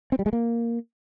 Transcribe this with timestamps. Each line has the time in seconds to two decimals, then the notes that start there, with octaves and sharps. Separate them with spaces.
0.12 C4
0.19 G3
0.26 G#3
0.33 A#3